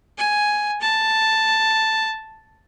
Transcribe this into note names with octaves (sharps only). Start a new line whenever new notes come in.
G#5
A5